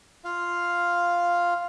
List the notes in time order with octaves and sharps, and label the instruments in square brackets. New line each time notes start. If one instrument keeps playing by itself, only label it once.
[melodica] F4 F5